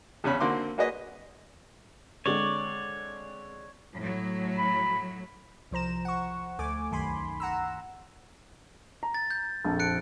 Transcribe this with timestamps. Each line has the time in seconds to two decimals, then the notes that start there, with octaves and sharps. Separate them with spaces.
0.24 E2 C#3 C#4 B5
0.40 D3 A#3 C4 F#4 C6 D6
0.78 A#3 F#4 G#4 B4 D#5
2.26 D3 G#3 C4 C#5 D5
3.97 A2 F#3
4.57 B5
5.71 C2 F3 C5 A#5 E7
6.05 F#5 C#6
6.59 D2 A3 G#5 D6
6.91 C2 F#2 D#3 G#5 B5 C6
7.40 F#5 A#5 E6
9.03 A#5
9.14 A6
9.31 G6
9.64 A#1 F2 A4
9.80 F#6 C#7 D7